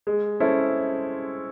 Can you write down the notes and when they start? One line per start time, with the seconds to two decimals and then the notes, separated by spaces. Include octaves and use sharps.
0.07 G#3
0.40 C#4 E4 A4 C5